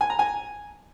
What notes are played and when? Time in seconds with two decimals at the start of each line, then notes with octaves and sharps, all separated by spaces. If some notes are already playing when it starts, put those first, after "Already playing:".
0.01 G#5
0.10 A#5
0.19 G#5